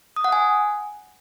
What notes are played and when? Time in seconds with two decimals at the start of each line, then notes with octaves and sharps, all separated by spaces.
0.16 D#6
0.24 F#5
0.32 G#5